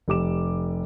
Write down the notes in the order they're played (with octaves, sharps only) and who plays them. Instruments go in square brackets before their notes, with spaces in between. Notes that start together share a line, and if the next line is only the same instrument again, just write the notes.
[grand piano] F1 G4 D6 E7